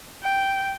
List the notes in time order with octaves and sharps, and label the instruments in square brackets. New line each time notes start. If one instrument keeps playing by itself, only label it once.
[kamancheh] G5